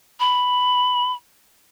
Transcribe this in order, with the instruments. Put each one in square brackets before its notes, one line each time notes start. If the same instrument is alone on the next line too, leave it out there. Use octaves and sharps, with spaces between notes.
[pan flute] B5